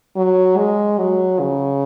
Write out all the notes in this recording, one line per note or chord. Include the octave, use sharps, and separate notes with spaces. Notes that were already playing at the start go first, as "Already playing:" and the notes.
F#3
G#3
F#3
C#3